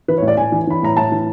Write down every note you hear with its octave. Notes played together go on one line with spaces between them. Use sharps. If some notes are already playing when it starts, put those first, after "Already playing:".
E3 B4
C#5
A2
D5
A2 G#5
E3
E3 B5
A2 A#5
A2 A5
E3